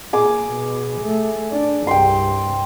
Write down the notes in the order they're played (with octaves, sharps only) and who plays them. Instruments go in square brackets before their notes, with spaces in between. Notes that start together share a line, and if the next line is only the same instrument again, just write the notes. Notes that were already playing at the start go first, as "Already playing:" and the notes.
[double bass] A#2 [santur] G#4 D6
[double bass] B2
A3
D4
[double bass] C2 G2 [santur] G5 C6